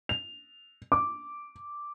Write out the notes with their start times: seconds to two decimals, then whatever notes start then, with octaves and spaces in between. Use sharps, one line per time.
0.09 F7
0.92 D6